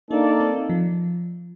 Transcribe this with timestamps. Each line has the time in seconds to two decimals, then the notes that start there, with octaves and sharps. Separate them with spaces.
0.11 A#3 D4 D#4 A4 D5
0.40 C4
0.69 F3